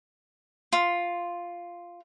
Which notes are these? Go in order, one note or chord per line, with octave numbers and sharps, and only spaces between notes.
F4